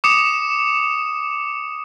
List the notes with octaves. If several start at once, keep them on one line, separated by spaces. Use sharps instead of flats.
D6 D#6 C#7 E7